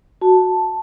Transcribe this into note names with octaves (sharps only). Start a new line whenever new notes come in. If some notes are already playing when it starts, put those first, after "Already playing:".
F#4 A5